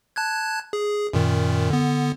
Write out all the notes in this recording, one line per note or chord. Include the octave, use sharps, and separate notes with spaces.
A5 F#6 G#6
G#4
F#2 A#2 D#3
D3 B3